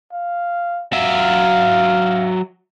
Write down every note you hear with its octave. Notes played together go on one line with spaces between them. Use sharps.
F5
F#3 E5 F5